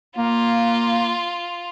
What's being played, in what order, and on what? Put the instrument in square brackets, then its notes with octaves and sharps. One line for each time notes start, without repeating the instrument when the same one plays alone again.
[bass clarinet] A#3 [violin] F4